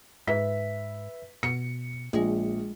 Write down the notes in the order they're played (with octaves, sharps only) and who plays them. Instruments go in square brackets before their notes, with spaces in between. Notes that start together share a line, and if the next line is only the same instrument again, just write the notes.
[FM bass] G#2 [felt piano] B4 E5 B6
[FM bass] B2 [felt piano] C#7
[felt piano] A#1 [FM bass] G#3